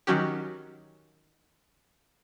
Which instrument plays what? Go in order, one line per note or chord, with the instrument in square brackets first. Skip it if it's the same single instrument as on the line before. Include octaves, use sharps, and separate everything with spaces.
[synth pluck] D#3 F#3 C#4 F#4 G4